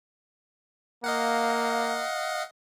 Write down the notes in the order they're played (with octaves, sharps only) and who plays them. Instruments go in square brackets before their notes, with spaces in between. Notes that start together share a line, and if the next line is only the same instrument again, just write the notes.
[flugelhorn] A#3 [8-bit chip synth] D#5 F5 F#5